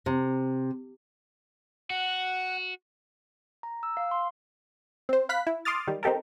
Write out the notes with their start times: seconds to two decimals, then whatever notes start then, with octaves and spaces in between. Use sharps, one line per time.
0.06 C3
1.90 F#4 F#5
3.63 A#5
3.83 E6
3.97 F5
4.11 C6
5.09 C4 C5
5.29 F5 B5 F#6 B6
5.47 E4
5.65 C6 D6 D#6 F6 A6
5.87 D#3 G3
6.03 C4 D#4 G4 A4 A#4